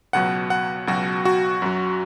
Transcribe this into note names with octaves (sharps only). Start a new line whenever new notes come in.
C#2 B2 F#3 F#5
F#5
C#2 B2 F#3 F#4
F#4
F#2 F#3